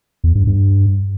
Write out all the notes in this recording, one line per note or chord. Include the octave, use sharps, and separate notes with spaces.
E2
G2
G2